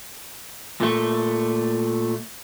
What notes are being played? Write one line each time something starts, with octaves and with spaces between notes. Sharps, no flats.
A#2 A3